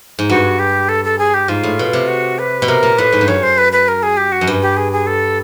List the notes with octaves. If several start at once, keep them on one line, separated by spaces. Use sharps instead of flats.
G#2
G2 F#4
G4
A4
A4
G#4
G4
G#2 F4
A2
B2
C3
F#4
B4
B2
C3 A#4
A#2
A2 B4
G#2
G2
F#2 C#5
C5
B4
B4
A#4
G#4
G4
F#4
F#2
G2
G4
G#4
G#4
A4